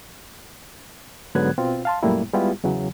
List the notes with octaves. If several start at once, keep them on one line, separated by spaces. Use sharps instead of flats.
G#2 D3 F#3 B3 F#6 G#6
B2 C4 F4
F5 A5 C6
F#2 A#2 G3 A3 A#3 E4
G3 G#3 B3 E4 F4 G4
E2 C#3 E3 F#3